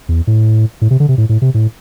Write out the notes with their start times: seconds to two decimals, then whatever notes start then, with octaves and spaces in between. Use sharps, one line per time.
0.09 E2
0.27 A2
0.81 A2
0.91 C3
1.00 D3
1.09 C3
1.18 A2
1.29 A2
1.42 C3
1.54 A2